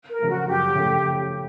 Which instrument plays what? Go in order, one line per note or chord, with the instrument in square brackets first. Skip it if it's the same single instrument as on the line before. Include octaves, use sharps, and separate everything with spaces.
[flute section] A#4
[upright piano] C#3 F3 A3
[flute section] F#4
[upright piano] F#2 [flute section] G4
[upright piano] C#3 F3 A3